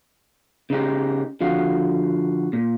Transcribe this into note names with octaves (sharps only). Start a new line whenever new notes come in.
C#3 D#4 G4
D3 F3 F#4 F5
A#2